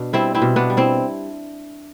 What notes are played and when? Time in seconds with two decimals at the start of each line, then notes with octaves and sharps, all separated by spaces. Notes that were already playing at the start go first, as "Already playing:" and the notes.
Already playing: B2 D4
0.13 G3 C4 E4
0.35 C4 E4
0.42 B2
0.56 B3 D4
0.70 G3
0.77 C4 E4